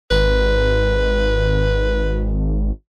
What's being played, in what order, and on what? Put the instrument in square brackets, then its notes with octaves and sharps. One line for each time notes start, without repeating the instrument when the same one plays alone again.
[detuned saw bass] G#1 [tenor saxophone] B4